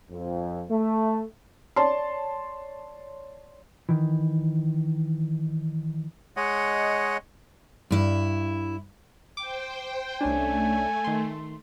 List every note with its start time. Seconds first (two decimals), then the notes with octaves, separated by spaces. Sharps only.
0.11 F2
0.70 A3
1.76 C#5 D5 A5 C6
3.89 D#3 E3
6.37 G#3 C#5 D#5 F#5
7.91 G2 E4
9.37 C5 G5 D6
10.21 C2 A3 C#4 D4 G#5
11.04 D#3 C6